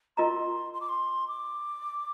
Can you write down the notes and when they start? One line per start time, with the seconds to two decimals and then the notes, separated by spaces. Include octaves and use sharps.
0.17 F4 A#4 D#5 A#5 C6
0.73 C6
0.81 D6
0.89 C6
1.28 D6